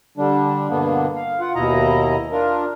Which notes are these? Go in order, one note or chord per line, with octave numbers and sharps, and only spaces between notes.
D3 G3 D4
G2 B2 D3 A#3 B3 D4
F5
F4 F#5
D#2 B2 E4 D#5 A#5
D4 F4 A#4